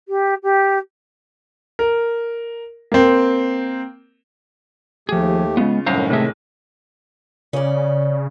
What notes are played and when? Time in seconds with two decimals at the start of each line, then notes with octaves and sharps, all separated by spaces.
0.08 G4
0.43 G4
1.79 A#4
2.92 A#3 C4
5.09 D#2 F3 A3 G4 G#4
5.57 C#3 G#3 B3 F4
5.86 C2 F#2 A2 D#3 C5 F5 A#5
6.10 A1 C3 G#3 A3 E5
7.53 C#3 C#4 D5